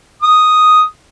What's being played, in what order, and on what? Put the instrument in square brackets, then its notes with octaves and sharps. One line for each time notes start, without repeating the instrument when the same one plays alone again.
[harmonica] D#6